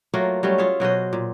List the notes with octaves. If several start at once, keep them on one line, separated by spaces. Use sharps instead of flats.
F#3 A3 A#3 F4
F#3 G3 A3 C#4
F4 G#4 C#5 E5
B2 F#3 C5 D#5
A#2